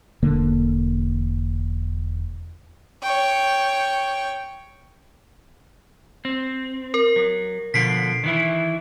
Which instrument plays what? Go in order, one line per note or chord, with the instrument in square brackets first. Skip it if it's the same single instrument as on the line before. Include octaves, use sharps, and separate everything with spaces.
[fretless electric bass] E1 D3 A#3
[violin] C#5 G5
[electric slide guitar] C4
[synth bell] A#4
[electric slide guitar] F#3
[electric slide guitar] B2 D3 F3 [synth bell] B6 C7 D7
[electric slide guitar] D#3 E3 E4